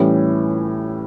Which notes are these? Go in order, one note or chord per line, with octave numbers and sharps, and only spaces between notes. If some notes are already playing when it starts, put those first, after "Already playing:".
Already playing: A2 E3 G3 C#4